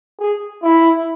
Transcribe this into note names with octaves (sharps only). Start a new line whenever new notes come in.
G#4
E4